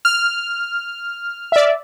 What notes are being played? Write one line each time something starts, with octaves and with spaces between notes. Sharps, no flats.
F6
D5 E5